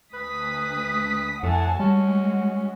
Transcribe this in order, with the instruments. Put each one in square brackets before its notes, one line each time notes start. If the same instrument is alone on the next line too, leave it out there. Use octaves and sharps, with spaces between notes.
[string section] D2 D#6 B6 [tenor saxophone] B4
[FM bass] F2 [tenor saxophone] A2 [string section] F#5 G#5 A5
[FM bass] G3 [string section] G#3 F#4 [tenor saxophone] C#4